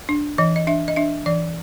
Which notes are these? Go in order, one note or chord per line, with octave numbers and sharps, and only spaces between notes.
D4
E3 D#5
D#5
D4 E5
D#5
D4 E5
E3 D5